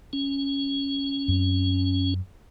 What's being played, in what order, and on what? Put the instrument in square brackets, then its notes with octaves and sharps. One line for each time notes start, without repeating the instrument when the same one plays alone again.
[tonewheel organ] C#4
[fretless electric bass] F#2 C4